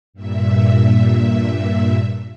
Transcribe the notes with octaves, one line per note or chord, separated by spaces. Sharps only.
G2 A#2 E5